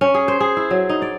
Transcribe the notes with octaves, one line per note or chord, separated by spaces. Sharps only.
C#4
G#4
C5
G#4
E4
F#3
D#4
D5